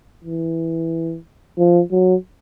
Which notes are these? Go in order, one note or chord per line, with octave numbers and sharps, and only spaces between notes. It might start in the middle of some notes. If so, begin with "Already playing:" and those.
E3
F3
F#3